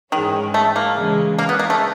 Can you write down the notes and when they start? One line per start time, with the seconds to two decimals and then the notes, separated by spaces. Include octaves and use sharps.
0.12 G#2 D#3 E3 G#3 C#4
0.54 A3
0.76 A#3
0.97 C#3 E3 G#3
1.39 A#3
1.49 B3
1.59 A#3
1.70 A3